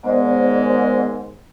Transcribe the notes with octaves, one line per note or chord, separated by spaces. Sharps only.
D#2 G#2 G#3 B3 C5 D5